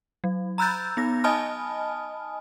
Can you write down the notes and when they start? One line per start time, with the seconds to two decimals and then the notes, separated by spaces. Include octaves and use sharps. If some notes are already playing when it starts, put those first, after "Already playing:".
0.24 F#3
0.58 A#5 B5 E6 F#6 G6 A6
0.97 B3 D#4 A#6
1.24 D#5 G#5 A5 B5 D#6 F6